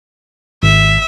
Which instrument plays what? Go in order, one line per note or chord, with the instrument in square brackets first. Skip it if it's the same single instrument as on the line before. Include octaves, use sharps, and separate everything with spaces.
[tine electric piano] G#1 [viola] E5